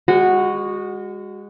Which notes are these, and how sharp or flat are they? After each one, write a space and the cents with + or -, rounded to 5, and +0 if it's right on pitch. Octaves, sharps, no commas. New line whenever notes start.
G#3 -30 F#4 -5